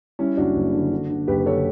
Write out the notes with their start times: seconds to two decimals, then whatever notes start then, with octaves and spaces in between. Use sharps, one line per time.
0.19 G3 C#4 E4
0.37 F#1 D4 F#4
0.55 F#1
0.73 D3
0.91 D3
1.09 D3
1.28 F#1 G4 B4
1.45 D3 A4 C#5